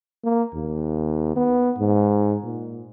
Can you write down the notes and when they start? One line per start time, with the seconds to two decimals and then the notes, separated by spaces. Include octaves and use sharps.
0.24 A#3
0.54 D#2
1.36 B3
1.78 G#2
2.43 A#2